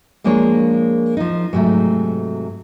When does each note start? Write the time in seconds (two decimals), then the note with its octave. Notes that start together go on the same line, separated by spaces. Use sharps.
0.24 F3 G#3 A#3 D4 F4 C#5
1.17 F3 D#4
1.53 G#2 C3 F#3 G3 A3